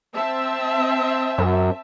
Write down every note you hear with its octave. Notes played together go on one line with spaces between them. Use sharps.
C4 E5 A5
F#2